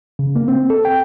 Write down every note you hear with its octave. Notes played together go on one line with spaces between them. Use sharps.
C#3
A#3
C4
A4
G5